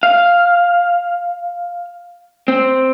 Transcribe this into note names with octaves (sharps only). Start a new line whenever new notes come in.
F5
C4